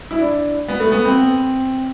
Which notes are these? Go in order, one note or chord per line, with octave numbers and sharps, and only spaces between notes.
E4
D4
B3
A3
B3
C4